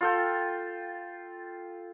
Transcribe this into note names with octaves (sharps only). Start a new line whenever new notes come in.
F4 A4 G5